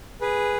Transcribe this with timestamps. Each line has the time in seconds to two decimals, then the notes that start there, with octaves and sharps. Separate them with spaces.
0.21 G#4 B4